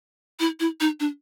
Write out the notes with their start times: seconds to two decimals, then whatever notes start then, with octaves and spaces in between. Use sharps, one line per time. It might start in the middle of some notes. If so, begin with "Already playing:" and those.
0.40 E4
0.60 E4
0.80 D#4
1.00 D4